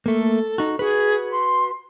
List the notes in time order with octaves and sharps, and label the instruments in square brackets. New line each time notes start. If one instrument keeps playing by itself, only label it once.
[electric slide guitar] A3 A#3 [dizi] A4
[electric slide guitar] D#4 F#4
[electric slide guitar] F#4 B4 [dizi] G#4
[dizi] C6